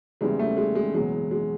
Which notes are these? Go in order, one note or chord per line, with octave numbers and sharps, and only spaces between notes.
F#1 E2 C#3 E3 G3 G#3
A3
G#3
G#3
F#1 E2 B2 F#3 G#3
G#3